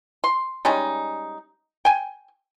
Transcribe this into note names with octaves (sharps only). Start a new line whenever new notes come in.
C6
G3 G#3 C#4 D#4
G5 G#5